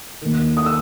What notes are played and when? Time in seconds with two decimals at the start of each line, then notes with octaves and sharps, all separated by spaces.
0.22 D#2 D#3
0.57 D#6
0.66 E6